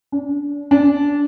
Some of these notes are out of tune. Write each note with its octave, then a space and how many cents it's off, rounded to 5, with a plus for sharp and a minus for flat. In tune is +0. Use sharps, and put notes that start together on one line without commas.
D4 -30
D4 -20